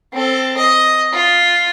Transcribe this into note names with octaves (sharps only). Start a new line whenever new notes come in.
C4 A4
D#5
F4